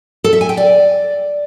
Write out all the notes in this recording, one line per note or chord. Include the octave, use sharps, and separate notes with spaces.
A4
E5
G#5
G5
D5